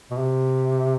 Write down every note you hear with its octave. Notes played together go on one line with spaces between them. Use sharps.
B2
C3